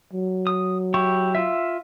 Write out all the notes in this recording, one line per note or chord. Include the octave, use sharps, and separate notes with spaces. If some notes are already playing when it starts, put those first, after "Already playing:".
F#3
D#6
E4 G4 C#6
F4 E5